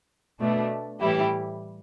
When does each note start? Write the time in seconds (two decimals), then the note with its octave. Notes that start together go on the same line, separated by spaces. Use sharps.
0.40 B2 A3 D4
1.00 A2 E3 G3 E4 G4